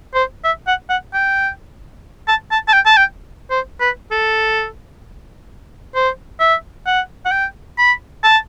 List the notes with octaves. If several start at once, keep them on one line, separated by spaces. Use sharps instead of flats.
C5
E5
F#5
F#5
G5
A5
A5
A5
G5
A5
G5
C5
B4
A4
C5
E5
F#5
F#5
G5
B5
A5